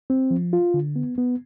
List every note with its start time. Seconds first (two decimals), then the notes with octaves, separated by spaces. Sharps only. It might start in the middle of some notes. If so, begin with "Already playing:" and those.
0.10 C4
0.31 F3
0.53 F4
0.74 D3
0.96 B3
1.18 B3